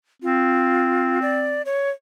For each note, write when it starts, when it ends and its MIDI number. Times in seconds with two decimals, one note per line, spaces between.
0.22 1.65 60
0.22 1.19 65
1.22 1.62 74
1.65 1.90 73